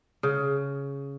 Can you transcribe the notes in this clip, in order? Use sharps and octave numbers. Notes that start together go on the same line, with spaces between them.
C#3